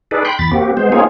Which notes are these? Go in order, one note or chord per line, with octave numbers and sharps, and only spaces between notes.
D#4 G#4 A4 B4 D5
G5 B5 C6 F#6 G6
E2 B5 A6
A#3 C4 F#4 G4
G#3 B3 C5
A#3 C4 D#4 F4 G#4 C#5